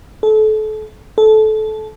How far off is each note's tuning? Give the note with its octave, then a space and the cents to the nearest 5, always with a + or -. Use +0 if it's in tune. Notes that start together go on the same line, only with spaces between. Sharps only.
A4 -30
A4 -20